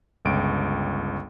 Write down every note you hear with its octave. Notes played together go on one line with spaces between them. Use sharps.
G1 C#2 D7